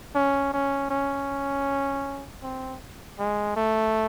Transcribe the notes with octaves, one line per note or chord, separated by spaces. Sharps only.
C#4
C#4
C#4
C4
G#3
A3